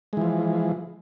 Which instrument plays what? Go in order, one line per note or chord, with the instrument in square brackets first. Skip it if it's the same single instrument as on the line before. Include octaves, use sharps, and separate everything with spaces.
[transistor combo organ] G#3
E3
F3